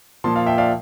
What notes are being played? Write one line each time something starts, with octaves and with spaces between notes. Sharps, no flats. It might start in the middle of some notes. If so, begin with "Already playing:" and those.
A#2 F3 A5 C6
F5 A5
E5 G5
D5 F5